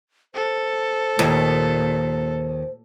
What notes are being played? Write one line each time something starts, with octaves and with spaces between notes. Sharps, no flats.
A4 C5
D#2 A#2